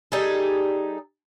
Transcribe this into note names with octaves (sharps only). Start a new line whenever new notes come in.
G3 D#4 G#4 A4